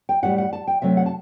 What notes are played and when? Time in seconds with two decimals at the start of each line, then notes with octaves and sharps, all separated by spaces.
0.09 G5
0.23 A2 G3 F#5
0.38 F#5
0.53 A5
0.67 G5
0.82 C3 F#3 A3 E5
0.97 F#5
1.06 A5